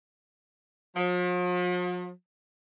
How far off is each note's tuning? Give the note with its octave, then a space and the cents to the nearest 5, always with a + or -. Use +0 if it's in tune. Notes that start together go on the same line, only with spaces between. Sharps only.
F3 +45